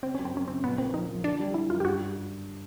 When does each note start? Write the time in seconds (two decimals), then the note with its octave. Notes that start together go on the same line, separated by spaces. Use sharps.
0.03 C#3 C4
0.15 F#2 C#4
0.25 C4
0.33 F#2 C#4
0.48 C#3 C4
0.64 A#1 B3
0.78 A#3 C4
0.94 F3 D#4
1.10 F3
1.24 D3 D4
1.39 G3
1.54 G3 E4
1.69 F#2 F4
1.80 G4
1.84 G2 F#4